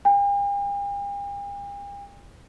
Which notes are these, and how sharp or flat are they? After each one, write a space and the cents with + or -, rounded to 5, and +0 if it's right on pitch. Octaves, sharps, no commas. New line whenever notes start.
G5 +45